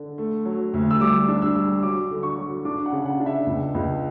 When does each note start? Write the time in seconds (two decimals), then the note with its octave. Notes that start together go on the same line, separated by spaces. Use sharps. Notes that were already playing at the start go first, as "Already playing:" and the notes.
Already playing: D3
0.18 A3
0.45 F#3
0.74 D2
0.91 E6
1.01 G3 D6
1.28 D4
1.42 E6
1.56 G3
1.83 F#3 D6
2.10 D3
2.23 C#6
2.38 F#3
2.65 D4 D6
2.86 F#5
2.92 C#3
3.05 F#5
3.20 D4
3.26 E5
3.47 C#2
3.75 C#2